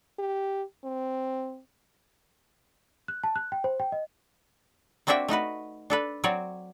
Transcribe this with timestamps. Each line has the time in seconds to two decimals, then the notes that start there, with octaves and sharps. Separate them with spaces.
0.19 G4
0.84 C4
3.08 F#6
3.24 A5
3.36 F#6
3.52 G5
3.64 C5
3.80 G5
3.92 D#5
5.07 A#3 C4 D4 F#4 E5 G5
5.28 A3 D#4 F#4 B4
5.90 D4 A4 B4
6.24 F#3 C4 F#4 C#5 D5